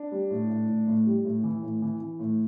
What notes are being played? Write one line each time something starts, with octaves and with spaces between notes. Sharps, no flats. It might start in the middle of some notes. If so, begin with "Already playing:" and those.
Already playing: D4
G3
A2
A2
A2
A2
G3
A2
E3
A2
E3
E3
A2